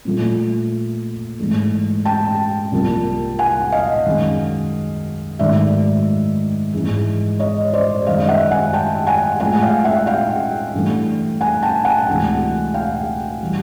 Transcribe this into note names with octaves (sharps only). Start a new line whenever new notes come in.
A#2 F3 A3
G#2 E3 A3
G5 A5
C2 C3 F3 A#3
F#5 G#5
D#5 F5
F#2 D#3 G#3
G#2 D#3 F#3 A3 D5 E5
G#2 E3 G#3
C#5 D#5
C5 D5
F#2 D#3 G#3 D#5 F5
E5 F#5
F#5 G#5
G5 A5
F#5 G#5
A2 F3 G#3 F#5 G#5
F5 G5
E5 F#5
F5 G5
G2 E3 A3
F#5 G#5
G5 A5
F#5 G#5
D2 C3 E3 G#3
F5 G5
E3 G3